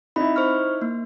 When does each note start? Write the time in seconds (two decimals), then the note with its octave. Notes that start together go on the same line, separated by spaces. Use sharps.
0.16 C4 D#4 E4 B5
0.36 C5 C#6 F6
0.82 A#3